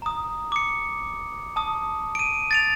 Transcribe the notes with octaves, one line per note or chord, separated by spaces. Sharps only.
A#5 D#6
D6 C#7
A5 D#6
D7 D#7
A6 D7 F7